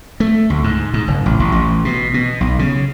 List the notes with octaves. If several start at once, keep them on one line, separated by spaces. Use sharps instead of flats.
A3
D2
G#2
G#2
F#1
A1
A1
A1
B2
B2
B1
C#3